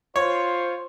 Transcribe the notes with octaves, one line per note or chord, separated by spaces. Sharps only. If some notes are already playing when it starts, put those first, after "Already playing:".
F4 C5 C#5